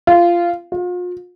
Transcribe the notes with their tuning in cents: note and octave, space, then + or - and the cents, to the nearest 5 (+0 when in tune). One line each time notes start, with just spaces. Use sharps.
F4 -15
F4 +40